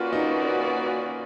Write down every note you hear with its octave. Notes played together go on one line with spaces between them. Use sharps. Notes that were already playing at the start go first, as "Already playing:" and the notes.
Already playing: A#3 C#4 F4 F#4 B4 D5
D#4